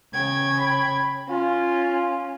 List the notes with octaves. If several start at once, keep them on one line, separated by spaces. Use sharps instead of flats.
C#3 G5 G#6
B5
C#4 F4